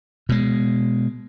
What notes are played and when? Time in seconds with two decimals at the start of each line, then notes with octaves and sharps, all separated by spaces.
0.29 B2 G#3